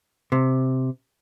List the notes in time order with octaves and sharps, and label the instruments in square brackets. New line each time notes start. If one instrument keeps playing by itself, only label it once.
[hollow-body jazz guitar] C3